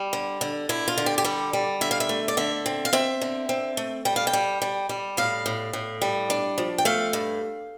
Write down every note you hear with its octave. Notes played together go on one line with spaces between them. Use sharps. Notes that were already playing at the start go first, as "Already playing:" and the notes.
Already playing: G3
D3
D3
D3 E4
F4
D3
G4
G4
G3 A4
G3
D3 E5
F5
E5
A3
D5
D3 E5
C4
F5
C4 E5
D3
C4
A3
G3 G5
F5
G5
G3
G3
G3
A2 F5
A2
A2
G3
D4
F3
G5
A3 F5
G2